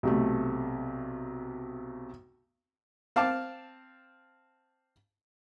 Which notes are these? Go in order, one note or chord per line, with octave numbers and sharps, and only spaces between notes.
B1 C3 A3
C4 F5 A5 D6